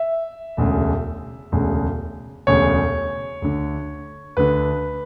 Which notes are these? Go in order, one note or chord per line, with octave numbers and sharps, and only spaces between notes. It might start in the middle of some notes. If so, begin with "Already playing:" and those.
Already playing: E5
E1 D2 C#3
E1 D2 C#3
E1 D2 C#3 C#5
D2 D3
D2 D3 B4